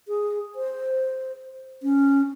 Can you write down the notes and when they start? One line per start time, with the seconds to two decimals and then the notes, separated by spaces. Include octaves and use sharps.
0.08 G#4
0.55 C5
1.83 C#4